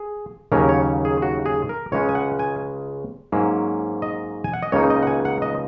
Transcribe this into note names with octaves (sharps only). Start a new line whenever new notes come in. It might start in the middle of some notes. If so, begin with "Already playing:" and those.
Already playing: G#4
D#2 C#3 F#3 A#3 C#4 A#4
C#5
G#4
F#4
G#4
A#4
C#2 C#3 G#3 C#4 C#5
G#5
F#5
G#5
G#2 F#3 A#3 C#4
D#5
G#5
F#5
D#5
C#2 C#3 A#3 D#4 C#5
D#5
F#5
G#5
F#5
D#5